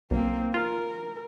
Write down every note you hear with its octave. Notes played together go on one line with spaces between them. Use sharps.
B1 A#3 C4
F4 A#4